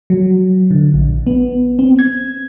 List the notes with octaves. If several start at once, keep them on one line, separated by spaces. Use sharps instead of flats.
F#3
D3
A#1
B3
C4
G#6